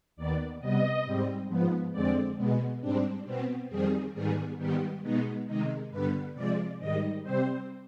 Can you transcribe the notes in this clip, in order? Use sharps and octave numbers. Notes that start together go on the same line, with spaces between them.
D#2 D#3 B3 D5
C3 G3 B3 D#5
G#2 G3 C4
G#2 F3 B3
F2 D3 G#3 C4 D5
B2 G#3 B3
G#2 G3 C4 D4
B2 B3 C4
F2 D#3 G3 C4 G#4
G#2 D#3 G3 B3 G#4
G#2 D#3 G3 B3 G4
B2 G#3 B3 D#4
C3 D#3 G#3 D#4
G2 D3 G3 B3 B4
C3 F3 G#3 D5
G#2 D#3 G3 D#5
C3 G3 C4 C5